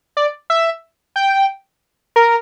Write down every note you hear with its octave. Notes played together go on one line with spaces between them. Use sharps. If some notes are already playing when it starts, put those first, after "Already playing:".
D5
E5
G5
A#4